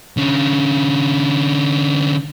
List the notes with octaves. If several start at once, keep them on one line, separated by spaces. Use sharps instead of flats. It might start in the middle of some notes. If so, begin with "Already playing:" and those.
D3 C#4